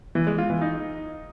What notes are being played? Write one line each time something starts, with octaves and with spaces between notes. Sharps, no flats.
E3
G#3
F4
E3
D#4